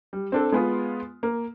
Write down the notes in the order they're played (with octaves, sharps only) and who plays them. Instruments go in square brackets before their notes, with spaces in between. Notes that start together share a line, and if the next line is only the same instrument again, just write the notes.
[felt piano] G3
C4 D4 A4
G#3 B3 F4
A#3